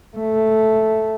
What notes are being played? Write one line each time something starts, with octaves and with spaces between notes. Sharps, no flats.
A3